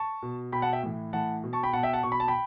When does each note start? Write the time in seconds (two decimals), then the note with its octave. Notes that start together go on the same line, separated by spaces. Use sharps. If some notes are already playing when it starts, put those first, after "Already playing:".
Already playing: A5 C#6
0.22 B2
0.52 B2 G5 B5
0.62 F#5 A5
0.73 E5 G5
0.83 A2 E3
1.13 A2 E3 F#5 A5
1.44 B2
1.53 A5 C#6
1.63 G5 B5
1.73 B2 F#5 A5
1.83 E5 G5
1.93 F#5 A5
2.03 B2 C#6
2.12 B5
2.20 A5
2.28 G5 B5